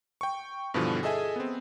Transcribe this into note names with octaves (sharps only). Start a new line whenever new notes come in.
G5 C#6
G2 B2 D3 E3 F3
G#4 A4 D#5 E5 G#5
B3 C4